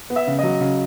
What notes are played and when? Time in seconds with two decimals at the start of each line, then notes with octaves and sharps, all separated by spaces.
0.10 B3
0.16 E5
0.27 C#3
0.39 F#3 D#5
0.61 C#3